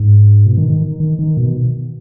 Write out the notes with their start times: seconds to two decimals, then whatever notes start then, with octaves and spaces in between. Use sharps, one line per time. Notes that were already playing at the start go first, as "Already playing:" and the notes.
Already playing: G#2
0.46 B2
0.58 D#3
0.70 D#3
1.00 D#3
1.19 D#3
1.37 B2